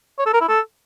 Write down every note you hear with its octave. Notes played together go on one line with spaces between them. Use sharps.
C#5
A4
A#4
E4
A4